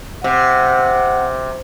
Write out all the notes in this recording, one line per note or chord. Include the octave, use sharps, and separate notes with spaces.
C3 F#5